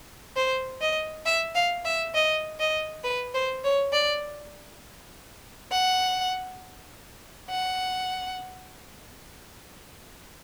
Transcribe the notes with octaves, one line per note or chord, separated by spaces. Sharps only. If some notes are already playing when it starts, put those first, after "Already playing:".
C5
D#5
E5
F5
E5
D#5
D#5
B4
C5
C#5
D5
F#5
F#5